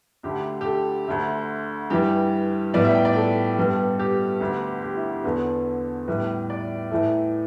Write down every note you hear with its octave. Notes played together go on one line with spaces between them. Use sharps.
D2 D3 A3 G4
G4
A4
D2 D3 A3
G2 E3 G3 G4
A2 G3 B3 D5
E5
G5
D5
A4
G2 G3 B3
G4
D2 D3 B3
G4
E4
G4
E2 D3 B3 A4
A2 G3 B3 B4
D5
A2 E3 A3